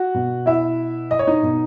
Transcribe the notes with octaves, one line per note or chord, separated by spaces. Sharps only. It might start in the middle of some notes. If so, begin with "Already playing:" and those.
Already playing: F#4 F#5
B2
E4 E5
D#5
C#5
D#4 D#5
B2